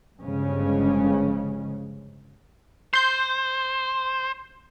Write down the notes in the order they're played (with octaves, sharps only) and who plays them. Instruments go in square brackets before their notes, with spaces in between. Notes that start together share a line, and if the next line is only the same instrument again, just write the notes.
[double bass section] G1 G2 C#3 F3 G#3 C#4
[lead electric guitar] C5 [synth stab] C6 G6